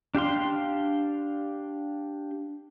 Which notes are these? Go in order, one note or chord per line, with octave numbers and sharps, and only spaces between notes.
D4 G4 F5 C6